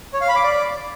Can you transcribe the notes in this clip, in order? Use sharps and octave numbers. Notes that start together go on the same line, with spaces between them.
C#5
F5
B5
D6
D5